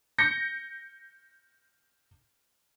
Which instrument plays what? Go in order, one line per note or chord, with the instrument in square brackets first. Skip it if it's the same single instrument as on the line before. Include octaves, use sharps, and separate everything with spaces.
[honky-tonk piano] G6 A#6 C#7